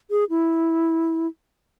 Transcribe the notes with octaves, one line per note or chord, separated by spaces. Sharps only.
G#4
E4